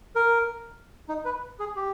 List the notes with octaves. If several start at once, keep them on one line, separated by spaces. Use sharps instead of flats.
A#4
D#4
B4
G#4
G4